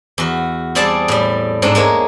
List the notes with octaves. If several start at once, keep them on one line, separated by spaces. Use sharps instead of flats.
E2 F#4
G3 C4 G#4 D5 A5
A2 G3
G#2 C4 D4
G#3 A#3 C#5